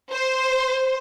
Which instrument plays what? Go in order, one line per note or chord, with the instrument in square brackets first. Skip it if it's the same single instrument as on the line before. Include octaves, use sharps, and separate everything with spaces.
[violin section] C5